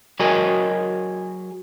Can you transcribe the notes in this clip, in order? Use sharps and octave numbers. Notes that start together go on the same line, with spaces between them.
F#3 F#4 G#4 A#4 D#5 G#5